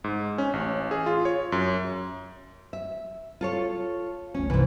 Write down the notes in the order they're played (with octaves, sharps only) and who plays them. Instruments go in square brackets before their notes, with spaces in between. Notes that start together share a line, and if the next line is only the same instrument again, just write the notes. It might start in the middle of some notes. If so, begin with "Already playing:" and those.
[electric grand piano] G#2
C#4
A1
G#4
F4
C#5
F#2
[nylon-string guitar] E5
F4 A4 C#5
[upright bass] G1 D2 [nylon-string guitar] C#4
[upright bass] C2 [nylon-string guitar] G#2 E3